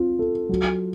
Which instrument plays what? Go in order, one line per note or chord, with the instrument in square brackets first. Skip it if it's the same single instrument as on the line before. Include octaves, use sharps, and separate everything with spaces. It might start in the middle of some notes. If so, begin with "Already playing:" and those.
Already playing: [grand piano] C4 F4
A4
F#3